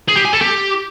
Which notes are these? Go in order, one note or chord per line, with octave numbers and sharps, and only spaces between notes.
G#4
G4
G#5
A4
G4